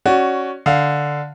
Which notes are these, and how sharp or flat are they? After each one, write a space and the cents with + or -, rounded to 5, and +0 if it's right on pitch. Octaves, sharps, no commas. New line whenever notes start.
C#4 +0 F#4 +10 D5 +0
D3 +0 F5 +0